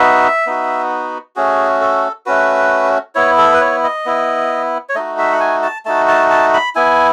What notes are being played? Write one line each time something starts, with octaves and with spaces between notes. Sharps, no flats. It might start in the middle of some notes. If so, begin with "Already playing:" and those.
Already playing: B3 D#4 F#4 E5
B3 D#4 F#4
A3 C#4 F#4 G#4
A4
A3 C#4 F#4 B4
B3 E4 C#5
A4
B4
C#5
D#5
B3 E4
C#5
A3 D#4 F#4 D#5
E5
F#5
G#5
A5
A3 D#4 F#4 A5
A5
A5
B5
B3 E4 G#5